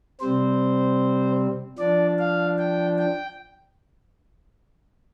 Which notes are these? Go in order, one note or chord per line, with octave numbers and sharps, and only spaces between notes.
C3 G3 C4 C5
F3 D4 D5
F5
G5
G5